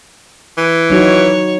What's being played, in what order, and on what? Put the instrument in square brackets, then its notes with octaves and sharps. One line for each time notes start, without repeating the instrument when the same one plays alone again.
[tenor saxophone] E3
[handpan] F#3 D#4 F#4 [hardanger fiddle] C#5